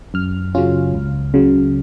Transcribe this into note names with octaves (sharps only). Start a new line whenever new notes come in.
F#2 F6
C#3 F#3 C#4 F4
C#2
C#3 F#3